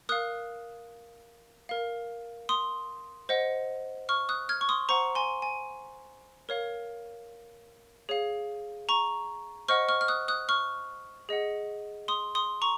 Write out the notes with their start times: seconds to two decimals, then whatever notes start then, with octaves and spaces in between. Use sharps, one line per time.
0.09 A#4 F5 D#6 F#6
1.69 A#4 F5
2.49 C6 D#6
3.29 C5 D#5 F#5
4.09 C#6 F6
4.29 D#6 F#6
4.49 F6 G#6
4.61 C#6
4.69 C6 D#6
4.89 C5 F#5 A#5 C#6
5.15 G#5 C6
5.42 G#5
6.49 A#4 C#5 F5
8.09 G#4 C#5 F5
8.89 A#5 C#6
9.68 C5 D#5 F#5 C#6 F6
9.89 C#6 F6
10.01 F6
10.08 D#6 F#6
10.28 D#6 F#6
10.49 C#6 F6
11.29 G#4 D#5 F#5
12.08 C6 D#6
12.35 C6 D#6
12.62 A#5 C#6